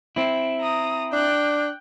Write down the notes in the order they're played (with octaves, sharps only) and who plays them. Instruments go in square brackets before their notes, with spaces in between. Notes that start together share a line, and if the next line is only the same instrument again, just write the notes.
[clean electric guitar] C4 E4
[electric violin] A#5 D#6
[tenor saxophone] D4 [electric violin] G5 F#6